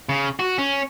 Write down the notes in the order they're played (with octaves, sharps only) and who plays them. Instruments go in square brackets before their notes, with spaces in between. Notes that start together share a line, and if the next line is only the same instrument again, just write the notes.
[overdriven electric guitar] C#3
F#4
C#4